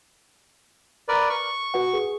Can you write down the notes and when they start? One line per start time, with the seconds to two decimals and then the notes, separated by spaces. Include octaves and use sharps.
1.08 A#4 B4 D5
1.30 C#6
1.74 F#4 B4 F#5
1.94 G#4